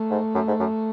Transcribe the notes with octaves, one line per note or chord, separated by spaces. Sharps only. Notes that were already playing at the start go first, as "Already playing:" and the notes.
Already playing: A3
G#2
F#2
G#2
F#2